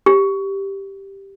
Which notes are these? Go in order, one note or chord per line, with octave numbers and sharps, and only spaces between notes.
G4